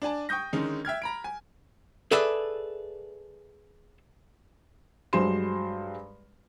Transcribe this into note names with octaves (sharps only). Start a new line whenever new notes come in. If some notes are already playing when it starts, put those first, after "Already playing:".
D4 D5 G#5 A5
G5 C#6 D#6 G6 A#6
D3 D#3 G#3 C#4 D#4
E5 G5 F6 G#6
A#5 B5 D7
G#5
G#4 A4 B4 D5 E5
G2 F#3 G#3 C5 C6 E7